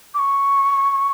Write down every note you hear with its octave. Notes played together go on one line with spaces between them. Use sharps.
D6
C#6